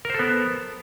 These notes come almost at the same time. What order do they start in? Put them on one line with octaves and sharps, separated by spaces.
A#4 C5 A4 B3